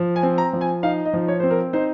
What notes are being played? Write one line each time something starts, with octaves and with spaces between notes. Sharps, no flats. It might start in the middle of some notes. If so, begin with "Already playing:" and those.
Already playing: F3
G#5
C4
A#5
F3
G#5
D#4 F5
D#5
F3
C#5
C4 C5
A#4
D#4 C5